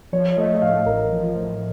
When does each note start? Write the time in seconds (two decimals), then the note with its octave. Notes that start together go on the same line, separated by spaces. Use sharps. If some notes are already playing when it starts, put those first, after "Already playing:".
0.12 F3 C#5
0.37 A3 D#5
0.55 D#5
0.62 A2 F5
0.86 A1 A#4
1.11 F3
1.36 A2